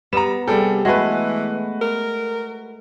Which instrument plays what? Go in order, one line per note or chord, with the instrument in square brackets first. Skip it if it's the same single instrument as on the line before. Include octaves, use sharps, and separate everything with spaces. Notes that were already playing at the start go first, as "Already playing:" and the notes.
[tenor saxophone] G3 [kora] B3 [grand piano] A#5 E7
[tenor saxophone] C3 [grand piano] G3 G#4 A4 [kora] G5
[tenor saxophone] E3 [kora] G#3 A3 [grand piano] F#4 B4
[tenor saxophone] A#4